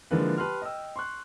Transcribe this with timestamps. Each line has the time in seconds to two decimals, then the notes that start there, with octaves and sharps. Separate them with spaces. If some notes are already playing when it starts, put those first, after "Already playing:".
0.11 D3 F3 G#3 A#3 E4 B4
0.38 G4 B4 A5 C6 F6
0.62 D#5 G5 E6
0.96 C6 C#6 F#6